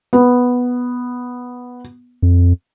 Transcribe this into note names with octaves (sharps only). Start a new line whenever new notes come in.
B3
F2